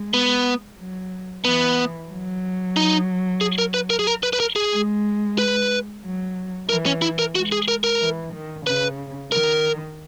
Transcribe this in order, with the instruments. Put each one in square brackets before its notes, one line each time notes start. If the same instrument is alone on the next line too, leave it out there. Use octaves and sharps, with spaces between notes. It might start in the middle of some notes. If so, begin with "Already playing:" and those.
Already playing: [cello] G#3
[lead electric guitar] B3
[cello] F#3
[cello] E3 [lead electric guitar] B3
[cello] F#3
[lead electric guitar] D#4
G#4
A#4
B4
A#4
G#4
A#4
B4
B4
A#4
G#4
[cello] G#3
[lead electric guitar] B4
[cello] F#3
[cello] E3 [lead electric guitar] A#4
[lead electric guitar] C#4
E4
A#4
[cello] G#3 [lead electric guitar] F#4
[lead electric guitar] G#4
A#4
A#4
[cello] E3
D#3
[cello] C#3 [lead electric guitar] B4
[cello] D#3 [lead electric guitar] A#4